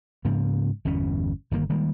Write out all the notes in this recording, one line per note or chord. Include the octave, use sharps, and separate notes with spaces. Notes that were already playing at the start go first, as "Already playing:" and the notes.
G#2 C#3 F3 A#3
G1 E2 B2 C#4
G1 D#3 A#3
D#3 G3 G#3 A#3